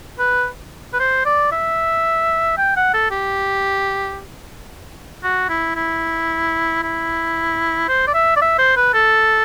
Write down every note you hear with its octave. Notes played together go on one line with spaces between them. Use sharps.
B4
B4
C5
D5
E5
G5
F#5
A4
G4
F#4
E4
E4
E4
C5
D5
E5
D5
E5
C5
B4
A4